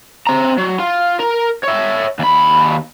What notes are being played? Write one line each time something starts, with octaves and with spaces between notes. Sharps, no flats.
C4 A#5
F#3
F4
A#4
C#5 E5
D#2 B5